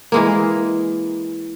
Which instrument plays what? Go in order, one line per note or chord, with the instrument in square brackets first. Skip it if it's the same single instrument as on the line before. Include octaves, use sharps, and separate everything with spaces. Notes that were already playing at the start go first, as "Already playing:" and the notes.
[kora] E3 G#3 A#3